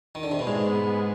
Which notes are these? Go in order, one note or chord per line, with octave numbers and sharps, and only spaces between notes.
D#3
D3
C3
B2
G#2 G#3
B3
G#3